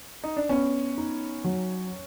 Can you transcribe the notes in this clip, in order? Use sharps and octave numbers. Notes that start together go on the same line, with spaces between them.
D#4
D4
B3 C#4
D#4
F#3